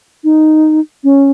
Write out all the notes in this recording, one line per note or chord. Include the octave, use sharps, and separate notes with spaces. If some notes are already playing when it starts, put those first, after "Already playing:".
D#4
C#4